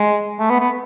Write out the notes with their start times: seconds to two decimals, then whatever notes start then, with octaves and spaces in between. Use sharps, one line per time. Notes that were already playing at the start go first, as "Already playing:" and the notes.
Already playing: G#3
0.39 A3
0.50 B3
0.60 B3